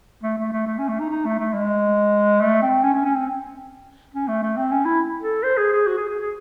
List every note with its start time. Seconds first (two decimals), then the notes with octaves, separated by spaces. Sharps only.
0.23 A3
0.38 A3
0.52 A3
0.66 A3
0.78 C#4
0.88 A3
1.00 D#4
1.10 D#4
1.25 A3
1.39 A3
1.53 G#3
2.40 A3
2.62 C4
2.83 C#4
2.94 C#4
3.05 C#4
3.15 C4
4.14 C#4
4.28 A3
4.42 A3
4.57 C4
4.72 C#4
4.85 E4
5.21 A4
5.43 C5
5.57 G#4
5.73 G#4
5.87 F#4
5.97 G#4
6.08 G#4
6.19 G#4